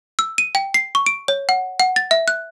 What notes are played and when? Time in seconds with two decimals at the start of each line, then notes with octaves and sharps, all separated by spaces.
0.19 E6
0.38 D#7
0.55 G5
0.74 C7
0.95 C#6
1.06 D7
1.28 C#5
1.49 F#5
1.80 F#5
1.96 A6
2.11 E5
2.28 F#6